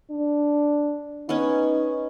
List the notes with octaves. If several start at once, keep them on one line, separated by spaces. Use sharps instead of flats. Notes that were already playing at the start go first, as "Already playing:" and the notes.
D4
B3 C#4 D#4